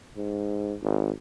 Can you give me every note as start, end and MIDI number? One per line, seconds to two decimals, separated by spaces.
0.17 0.76 44
0.82 1.12 32